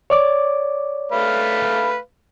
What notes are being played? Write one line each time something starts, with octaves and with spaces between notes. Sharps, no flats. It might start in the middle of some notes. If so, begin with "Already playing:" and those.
C#5 D5 D6
A3 B4 F5